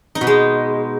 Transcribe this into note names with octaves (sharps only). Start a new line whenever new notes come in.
D#4
B2
G#3